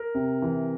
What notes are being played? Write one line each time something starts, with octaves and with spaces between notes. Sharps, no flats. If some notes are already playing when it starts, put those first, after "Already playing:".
Already playing: A#4
C3
E3